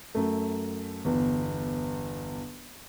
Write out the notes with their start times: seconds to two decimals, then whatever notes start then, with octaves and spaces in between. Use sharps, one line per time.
0.15 F#2 A3
1.05 G1 E2